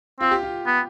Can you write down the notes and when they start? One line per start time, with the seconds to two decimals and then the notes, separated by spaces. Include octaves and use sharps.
0.20 C4 F4
0.31 G4
0.43 F4
0.67 B3